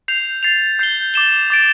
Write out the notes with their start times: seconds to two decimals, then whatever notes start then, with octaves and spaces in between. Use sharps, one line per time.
0.08 G6 C7 F7
0.43 A6 C7 F7
0.79 G6 C7 G7
1.14 D6 A6 E7 G7
1.50 D6 A6 D7